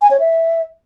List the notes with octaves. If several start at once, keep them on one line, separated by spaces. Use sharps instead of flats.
G#5
C#5
E5